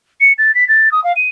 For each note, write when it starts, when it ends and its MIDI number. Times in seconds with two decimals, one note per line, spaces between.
0.21 0.33 97
0.38 0.54 93
0.55 0.67 95
0.68 0.92 93
0.92 1.03 87
1.04 1.13 77
1.16 1.29 99